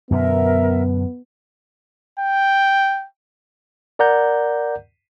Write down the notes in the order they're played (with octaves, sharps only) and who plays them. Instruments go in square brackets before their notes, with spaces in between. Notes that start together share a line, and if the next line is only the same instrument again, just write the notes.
[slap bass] F#2 B2 D3 [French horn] B3 [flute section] A#4 E5
[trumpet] G5
[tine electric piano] A#4 D5 F#5 A#5 G6